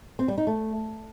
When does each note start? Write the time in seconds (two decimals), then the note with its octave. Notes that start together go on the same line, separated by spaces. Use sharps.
0.19 C4
0.28 G3
0.38 D#4
0.47 A3